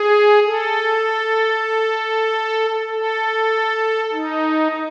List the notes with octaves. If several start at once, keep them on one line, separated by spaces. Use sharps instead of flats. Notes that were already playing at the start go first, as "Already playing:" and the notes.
Already playing: G#4
A4
A4
D#4